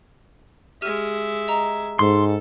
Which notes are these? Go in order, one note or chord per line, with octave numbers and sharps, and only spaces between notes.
G#3 G4 E5 F6 D#7
D#5 A#5
G#2 A4 C6